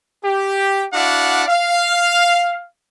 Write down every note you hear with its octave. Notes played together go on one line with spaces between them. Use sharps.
G4
D4 E4 F#4 D5 F5 F#5
F5